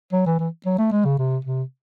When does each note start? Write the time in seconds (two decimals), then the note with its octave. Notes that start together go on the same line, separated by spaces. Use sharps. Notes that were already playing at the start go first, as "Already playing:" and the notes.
0.13 F#3
0.26 E3
0.39 E3
0.66 F#3
0.78 A3
0.92 G#3
1.05 C#3
1.18 C3
1.45 C3